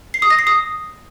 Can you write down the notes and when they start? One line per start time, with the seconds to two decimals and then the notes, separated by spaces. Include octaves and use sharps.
0.14 C7
0.22 D#6
0.30 A#6
0.39 C7
0.47 D#6